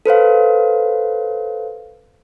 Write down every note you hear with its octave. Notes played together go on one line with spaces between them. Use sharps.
A4 B4 C5 F5